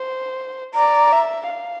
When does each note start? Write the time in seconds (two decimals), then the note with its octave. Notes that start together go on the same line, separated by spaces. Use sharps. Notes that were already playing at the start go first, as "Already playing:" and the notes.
Already playing: C5
0.74 D5 A#5
1.12 E5
1.50 F5